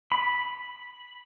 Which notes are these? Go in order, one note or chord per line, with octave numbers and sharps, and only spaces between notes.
B5